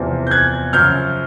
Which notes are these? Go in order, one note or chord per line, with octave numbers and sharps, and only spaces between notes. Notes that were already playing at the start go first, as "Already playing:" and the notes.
Already playing: E2 C3 F3
G6
F#6 G#6
F#2 C#3 F3 F6 G6